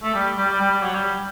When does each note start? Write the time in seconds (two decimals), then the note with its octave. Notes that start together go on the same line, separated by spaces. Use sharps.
0.03 A3
0.14 G3
0.37 G3
0.49 G3
0.60 G3
0.71 G3
0.83 F#3
0.95 G3